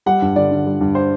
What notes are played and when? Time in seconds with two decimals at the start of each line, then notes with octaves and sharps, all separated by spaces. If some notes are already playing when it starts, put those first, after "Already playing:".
0.06 G3 F#5
0.22 G2
0.36 D3 D5
0.51 D3
0.66 G3
0.81 G2
0.95 C5